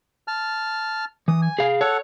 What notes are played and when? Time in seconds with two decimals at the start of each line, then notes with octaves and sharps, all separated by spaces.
0.28 A5 F6
1.28 E3 D#6
1.42 G#5
1.59 G#4 F5
1.81 A4 C#5 F#5